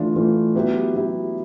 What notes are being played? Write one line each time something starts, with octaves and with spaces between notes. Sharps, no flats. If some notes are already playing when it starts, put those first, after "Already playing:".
Already playing: E3 A3 D4 F4
E3 A3 D4 F4
F#3 B3 E4 G4
F#3 B3 E4 G4